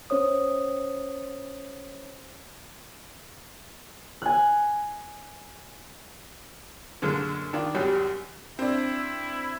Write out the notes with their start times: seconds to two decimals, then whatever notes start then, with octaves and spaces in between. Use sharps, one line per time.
0.10 C#4 C5 C#5 D#6
4.22 G#5 F#6
7.02 F#2 A#2 D3 G#3
7.53 D#3 D4 F4
7.74 C#2 F#2 G3 F#4 G4 C#5
8.59 C4 D4 E4